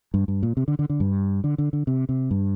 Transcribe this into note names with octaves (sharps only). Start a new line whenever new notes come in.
G2
G2
A#2
C3
D3
D3
D3
G2
D3
D3
D3
C3
C3
G2